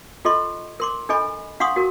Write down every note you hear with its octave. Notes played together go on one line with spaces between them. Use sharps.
F4 A4 D#5 C6 C#6
A#4 C6 D6
D4 A4 D#5 G#5 B5 C#6
D4 F5 F#5 C6 C#6 D#6
F#4 A#4